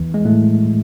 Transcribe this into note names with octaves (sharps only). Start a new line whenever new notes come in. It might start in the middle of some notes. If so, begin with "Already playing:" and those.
Already playing: E2 E3
G#3
A2 A3